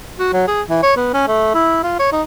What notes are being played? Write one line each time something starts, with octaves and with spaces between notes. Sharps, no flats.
F#4
F#3
G#4
E3
C#5
B3
C#4
A3
E4
F4
C#5
D#4